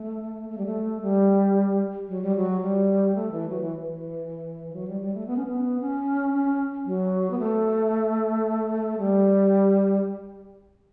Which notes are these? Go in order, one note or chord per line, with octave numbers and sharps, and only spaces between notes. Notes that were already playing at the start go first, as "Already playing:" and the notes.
Already playing: A3
A3
G3
A3
G3
F#3
G3
F#3
G3
A3
E3
F#3
E3
E3
F#3
G3
G3
A3
B3
C#4
B3
C#4
C#4
F#3
B3
A3
G3